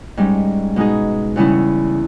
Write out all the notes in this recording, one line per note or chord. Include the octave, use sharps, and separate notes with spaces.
G#2 G3 C#4
B2 G#3 D#4 G#4
E2 C#3 G3 C#4 E4